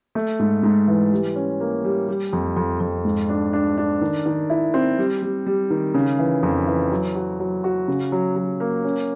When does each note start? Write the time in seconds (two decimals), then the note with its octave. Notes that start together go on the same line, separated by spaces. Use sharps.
0.15 A3
0.39 G#2
0.63 G#2
0.88 E3
1.12 G3
1.36 C#4
1.60 A#3
1.84 G3
2.08 G3
2.33 F2
2.56 F2
2.80 F2
3.05 G#2
3.29 D4
3.53 D4
3.78 D4
4.01 D#3
4.26 D#3
4.50 E4
4.74 C4
4.98 G3
5.22 G3
5.46 G3
5.70 D#3
5.94 C#3
6.19 E3
6.43 F2
6.67 E3
6.91 F#3
7.15 F#4
7.39 F#3
7.64 F#4
7.88 C#3
8.12 F#3
8.36 F#3
8.60 A#3
8.84 C#4